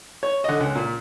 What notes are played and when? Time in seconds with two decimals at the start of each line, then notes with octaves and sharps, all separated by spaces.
0.23 C#5
0.44 D3 D#5
0.60 C#2
0.75 A#2